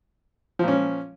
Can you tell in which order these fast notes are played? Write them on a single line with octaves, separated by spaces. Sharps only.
F3 A#2 C#4